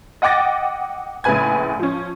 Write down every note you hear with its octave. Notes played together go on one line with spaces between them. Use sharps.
D#5 F#5 G5 D6 A6 A#6
A#1 A2 C#3 B4 G#5 G#6
F3 C#4